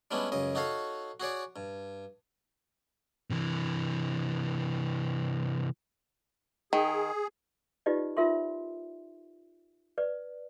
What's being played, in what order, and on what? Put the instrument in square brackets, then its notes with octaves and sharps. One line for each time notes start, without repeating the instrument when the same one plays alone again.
[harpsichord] G3 G#3 B3 C#4 D4 E4
C#2 F#2 C#3 D#5
D#4 F#4 A4 C#5 F5
F#4 G#4 C#5 D5
G2
[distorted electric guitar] C3 E3
[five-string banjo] D#3 [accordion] G#4
[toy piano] D#4 F4 G4 B4 D5 D#5
D#4 F4 A#4 E5 C6
B4 D5